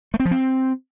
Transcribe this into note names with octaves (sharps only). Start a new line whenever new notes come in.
A3
C4
F3
C4